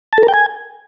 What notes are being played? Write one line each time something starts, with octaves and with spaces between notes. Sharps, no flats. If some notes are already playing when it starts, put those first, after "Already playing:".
A5
A4
A#4
G5
G#5